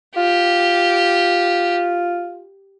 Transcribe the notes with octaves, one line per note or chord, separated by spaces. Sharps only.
F4 G4